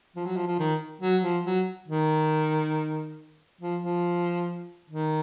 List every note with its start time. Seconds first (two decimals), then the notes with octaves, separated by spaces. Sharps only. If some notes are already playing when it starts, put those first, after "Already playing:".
0.16 F3
0.26 F#3
0.36 F3
0.47 F3
0.59 D#3
1.01 F#3
1.22 F3
1.45 F#3
1.88 D#3
3.61 F3
3.82 F3
4.90 D#3